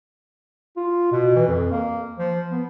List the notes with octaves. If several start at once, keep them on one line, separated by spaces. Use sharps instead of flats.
F4
B2
E3
F2
A#3
F3
B3